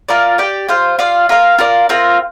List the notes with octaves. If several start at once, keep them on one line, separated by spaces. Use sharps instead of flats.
F4 A#4 D5
G4 D5 G5
F4 C5 F5
F4 D5 F5
F4 A#4 F5
F4 A#4 D5
C4 F4 A#4